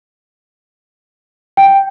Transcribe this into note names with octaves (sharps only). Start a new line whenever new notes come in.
G5